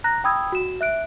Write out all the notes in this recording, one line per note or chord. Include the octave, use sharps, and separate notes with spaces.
A#5 F#6 A#6
G5 B5 D#6 E6 G#6
F#4 E7
E5 F#6 D7